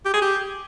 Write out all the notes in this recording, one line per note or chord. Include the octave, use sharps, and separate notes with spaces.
G4
G#4
G4